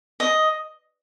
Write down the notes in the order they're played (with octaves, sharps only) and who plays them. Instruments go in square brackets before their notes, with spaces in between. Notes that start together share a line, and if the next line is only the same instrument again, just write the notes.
[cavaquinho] D#5